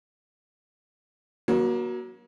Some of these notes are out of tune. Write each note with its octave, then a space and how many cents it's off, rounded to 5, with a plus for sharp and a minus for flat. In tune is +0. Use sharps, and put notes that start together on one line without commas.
F#3 +0 A#3 +35